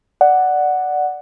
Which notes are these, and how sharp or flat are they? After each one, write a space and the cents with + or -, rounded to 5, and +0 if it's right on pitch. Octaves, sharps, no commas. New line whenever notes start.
D5 +0 F#5 +0